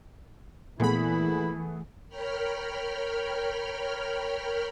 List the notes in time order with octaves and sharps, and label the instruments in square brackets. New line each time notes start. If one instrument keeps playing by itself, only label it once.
[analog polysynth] A#2 B5 [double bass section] E3 [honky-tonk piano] A3 B3 G#4 [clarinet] E4
[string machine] A#4 C#5 G5 B5 F6